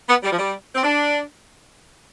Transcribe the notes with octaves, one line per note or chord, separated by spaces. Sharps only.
B3
G3
F3
G3
C4
D4